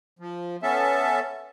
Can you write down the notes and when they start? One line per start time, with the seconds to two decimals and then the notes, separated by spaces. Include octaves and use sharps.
0.19 F3
0.63 B3 C#4 A4 E5 A5